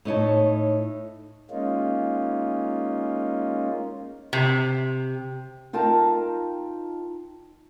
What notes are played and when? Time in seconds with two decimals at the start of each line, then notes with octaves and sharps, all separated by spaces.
0.05 A2 D#4 C#5 A5
1.51 G#3 A#3 C#4 D#4 F4
4.33 C3
5.73 D#4 F4 A#4 G5 A5